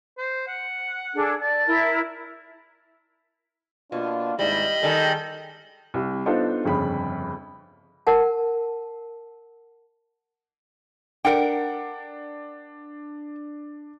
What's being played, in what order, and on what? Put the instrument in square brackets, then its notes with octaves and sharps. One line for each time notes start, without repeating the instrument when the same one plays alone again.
[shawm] C5
F#5
[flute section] D4 G#4 A4
[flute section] D5 [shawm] A5
[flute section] E4 A#4
[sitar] B2 [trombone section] A#3 D4 F4
[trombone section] G#1 G#2 E4 [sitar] G3 [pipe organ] D#5 B5
[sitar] D#3 G3 [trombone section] G#4 A4
[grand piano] C2
B3 D4 D#4 F4 A4 C5
G1 F2 C#3 B5
[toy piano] A#4 F#5 A5
[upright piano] D4 [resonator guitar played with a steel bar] A#4 F#5 G5